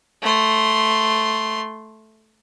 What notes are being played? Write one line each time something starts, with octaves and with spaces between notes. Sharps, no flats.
A3 C6